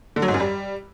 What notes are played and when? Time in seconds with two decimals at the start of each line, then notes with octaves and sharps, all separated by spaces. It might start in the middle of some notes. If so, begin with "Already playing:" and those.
0.16 D3
0.22 F#3
0.28 G#2
0.34 F#2
0.40 G3